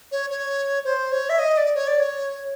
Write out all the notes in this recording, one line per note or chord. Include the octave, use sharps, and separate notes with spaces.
C#5
C#5
C5
C#5
E5
D#5
D5
C#5
D5
C#5